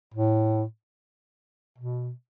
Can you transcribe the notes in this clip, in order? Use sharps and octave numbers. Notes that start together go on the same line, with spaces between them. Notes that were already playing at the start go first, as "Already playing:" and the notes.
A2
B2